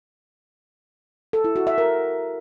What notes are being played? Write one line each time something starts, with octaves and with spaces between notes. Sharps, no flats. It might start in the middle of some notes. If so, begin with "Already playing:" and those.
A4
E4
F#4
E5
A#4